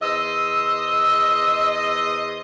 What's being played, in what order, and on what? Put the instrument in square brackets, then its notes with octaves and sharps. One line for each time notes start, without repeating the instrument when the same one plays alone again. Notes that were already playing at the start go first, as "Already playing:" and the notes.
[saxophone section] E2 C5 D#5 [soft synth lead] E6